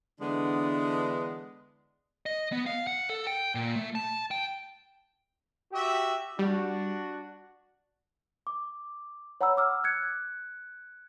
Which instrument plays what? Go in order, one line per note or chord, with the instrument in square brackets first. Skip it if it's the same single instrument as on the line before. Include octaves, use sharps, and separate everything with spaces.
[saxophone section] D3 E3 G#3 B3 D4
[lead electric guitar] D#5
B3
F5
F#5
A4
G5
A#2
A3
A5
G5
[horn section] F#4 G4 E5
[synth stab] G3 [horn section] D4 F#4
[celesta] D6
C#5 F#5 A#5 B5 E6
D6 E6 F6
F#6 G#6 C#7